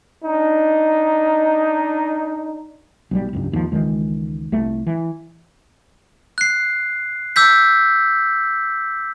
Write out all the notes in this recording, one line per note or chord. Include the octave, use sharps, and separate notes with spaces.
D4 D#4
B1 F#3 G3
F#1 C#2 G2
G#1 D#2 C#3 F3
C#2 D#3 E3 G#3
C2 A3
E3
F#6 C7
D6 E6 G6 B6